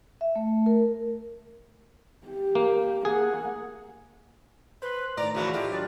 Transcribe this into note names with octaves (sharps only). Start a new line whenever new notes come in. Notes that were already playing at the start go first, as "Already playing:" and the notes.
E5
A3
A#4
G4
A#3
A#3 G#4 F#5
B4 C5 C6
A2 D#3 D5 A#5
C#3 E3 F3 F#4
E4 F4 G4 A4 D#5
F#3 D4 G4 D5